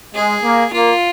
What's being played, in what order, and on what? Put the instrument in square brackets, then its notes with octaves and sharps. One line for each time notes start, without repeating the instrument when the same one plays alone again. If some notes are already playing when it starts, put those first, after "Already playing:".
[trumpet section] G#3 [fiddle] G#4
[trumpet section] A#3
[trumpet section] A#3 [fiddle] F4